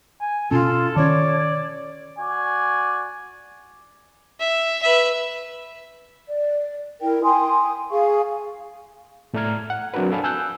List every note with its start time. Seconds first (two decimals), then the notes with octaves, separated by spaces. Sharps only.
0.21 G#5
0.51 B2 C#4 F4 A4
0.96 D#3 C#4 C#5 D5
2.19 F#4 D5 G#5 D6
4.40 E5
4.82 B4 E5
6.27 D5
7.00 E4 A#4 G5
7.23 G5 G#5 C6 D#6
7.90 G#4 F5 G#5 C#6
9.34 A2 A3 D5 A#5 F6 G#6
9.70 F#5
9.94 F#3 C4 D4 F#4 A#4 B4
10.12 A4 D5 F5 G#5 A5 B5
10.24 G#5 E6 F#6 G6